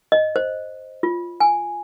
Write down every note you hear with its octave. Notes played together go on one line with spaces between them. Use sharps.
D#5
C5
F4
G#5